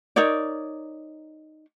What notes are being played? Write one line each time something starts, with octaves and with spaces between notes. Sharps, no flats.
D#4 A#4 C#5 D5